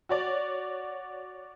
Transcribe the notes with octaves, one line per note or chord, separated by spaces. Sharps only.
F#4 C#5 D5